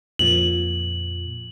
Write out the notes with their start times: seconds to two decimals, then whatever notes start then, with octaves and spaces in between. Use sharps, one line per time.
0.19 F2 A#2 F3 F#7